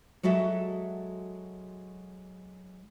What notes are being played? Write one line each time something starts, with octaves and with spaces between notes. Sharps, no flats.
F#3 G#3 F#4 A4 E5